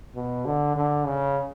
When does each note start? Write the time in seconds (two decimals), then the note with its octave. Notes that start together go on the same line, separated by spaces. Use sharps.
0.16 B2
0.46 D3
0.76 D3
1.06 C#3